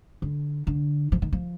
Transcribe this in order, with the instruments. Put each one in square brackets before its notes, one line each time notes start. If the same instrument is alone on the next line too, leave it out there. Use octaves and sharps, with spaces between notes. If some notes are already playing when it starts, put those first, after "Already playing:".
[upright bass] D3
D3
F3
D#3
F3